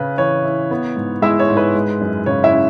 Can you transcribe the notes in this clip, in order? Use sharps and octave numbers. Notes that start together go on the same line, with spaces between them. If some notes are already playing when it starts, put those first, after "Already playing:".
Already playing: C#3 C#4 B4
E3 C#5
E4
B3
G#2
G#3 E4 E5
C#5
G#2
B4
G#3
F#2
C#3 C#5
E4 E5
C#4